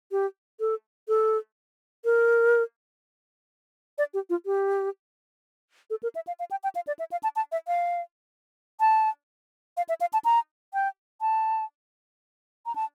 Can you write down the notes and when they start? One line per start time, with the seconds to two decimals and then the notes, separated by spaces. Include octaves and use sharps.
0.12 G4
0.60 A4
1.08 A4
2.05 A#4
3.98 D5
4.14 G4
4.30 F4
4.46 G4
5.90 A4
6.03 A#4
6.15 E5
6.27 F5
6.39 F5
6.51 G5
6.63 G5
6.75 F5
6.87 D5
6.99 E5
7.12 F5
7.23 A5
7.36 A5
7.52 E5
7.67 F5
8.80 A5
9.77 F5
9.89 E5
10.01 F5
10.13 A5
10.25 A#5
10.74 G5
11.21 A5
12.66 A#5
12.75 A5